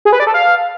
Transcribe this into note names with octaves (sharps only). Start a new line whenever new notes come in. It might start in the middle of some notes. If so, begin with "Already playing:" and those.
G#4
B4
D5
A4
F5